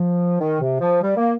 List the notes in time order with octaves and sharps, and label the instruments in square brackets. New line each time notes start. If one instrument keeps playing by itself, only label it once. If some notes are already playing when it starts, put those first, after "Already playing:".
Already playing: [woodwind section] F3
D#3
C3
F3
G3
A#3